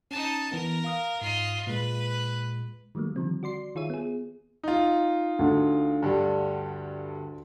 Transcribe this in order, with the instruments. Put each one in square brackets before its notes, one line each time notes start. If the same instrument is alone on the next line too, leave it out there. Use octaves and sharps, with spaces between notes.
[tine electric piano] C#4 A6 [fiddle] D#4 A5
[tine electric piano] E3 B3 [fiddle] A#4
[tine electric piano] F5 D#6 F6
[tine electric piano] G#2 [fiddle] F4 D#5
[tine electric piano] A#2 G#3 [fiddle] B4
[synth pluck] D#3 F#3 G3 A3 A#3
D3 D#3 F3 G3 C4
F#4 D5 C6 C7
D#3 F4 G#4 C#5 E5 D#7
B3 G#4
[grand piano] D#4 F4
[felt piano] D2
[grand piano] G2 D3 G3